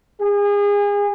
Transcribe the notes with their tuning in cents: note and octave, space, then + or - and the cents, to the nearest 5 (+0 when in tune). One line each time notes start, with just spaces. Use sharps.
G#4 -30